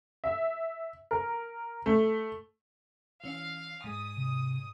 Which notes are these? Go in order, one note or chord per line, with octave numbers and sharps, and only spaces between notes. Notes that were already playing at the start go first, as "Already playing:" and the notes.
E5
A#4
A3
E3 C#4 F5
G#2 G#3 D#6
C3